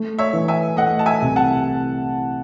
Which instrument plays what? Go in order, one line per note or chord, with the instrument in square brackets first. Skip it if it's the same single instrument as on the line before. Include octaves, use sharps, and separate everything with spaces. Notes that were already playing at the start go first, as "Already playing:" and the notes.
Already playing: [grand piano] A3
[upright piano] C#5 E5
[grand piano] E3
[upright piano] E5 G#5
[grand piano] A3 [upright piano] D#5 F#5
[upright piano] A5
E5 G#5
[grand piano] C2
[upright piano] F#5 A5